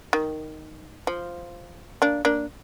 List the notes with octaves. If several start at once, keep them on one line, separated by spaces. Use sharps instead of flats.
D#3
F3
A#3 D4
A#3 D4